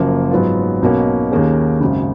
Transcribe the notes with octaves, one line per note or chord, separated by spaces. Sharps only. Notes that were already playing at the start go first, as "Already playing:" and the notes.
Already playing: F#1 F#2 F3 A#3
G#2 F#3 B3 F4
B1 B2 A#3 C#4
D#2 D#3 A#3 C#4 G#4
G#1 F#2 C#3